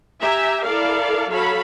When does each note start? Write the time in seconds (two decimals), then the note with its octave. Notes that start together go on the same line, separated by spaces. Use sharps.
0.20 G4 E5 G#5 A#5
0.63 E4 A4 A#4 D5 F5
1.29 F#3 A4 C#5 F5 B5